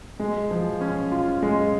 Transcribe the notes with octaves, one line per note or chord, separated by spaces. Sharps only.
G#3
F3
C#4
F4
G#3